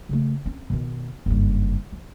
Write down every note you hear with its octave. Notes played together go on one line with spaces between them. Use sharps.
C#3 A3
C4 C#4
B2 D#3
F#1 G2
F3